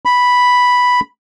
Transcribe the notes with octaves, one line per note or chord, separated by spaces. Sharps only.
B5